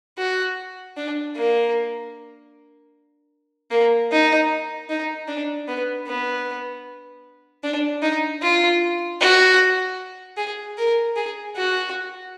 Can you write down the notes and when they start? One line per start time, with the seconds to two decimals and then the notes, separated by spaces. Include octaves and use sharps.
0.18 F#4
0.97 D4
1.36 A#3
3.71 A#3
4.11 D#4
4.89 D#4
5.28 D4
5.68 B3
6.07 B3
7.63 D4
8.02 D#4
8.42 F4
9.21 F#4
10.37 G#4
10.78 A#4
11.16 G#4
11.56 F#4